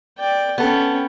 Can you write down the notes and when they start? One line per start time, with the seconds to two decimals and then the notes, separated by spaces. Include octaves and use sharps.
0.19 D5 G5
0.58 B3 C#4 A4 G5